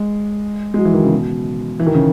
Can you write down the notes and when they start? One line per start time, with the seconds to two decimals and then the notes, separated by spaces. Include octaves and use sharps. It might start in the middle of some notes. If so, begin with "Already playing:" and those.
Already playing: G#3
0.74 G#3
0.78 F#3
0.85 E3
0.94 D#3
1.03 C#3
1.11 B2
1.80 E3
1.87 D#3
1.94 C#3